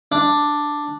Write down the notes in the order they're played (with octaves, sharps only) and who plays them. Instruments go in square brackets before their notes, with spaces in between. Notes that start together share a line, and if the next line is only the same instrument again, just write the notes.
[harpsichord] D4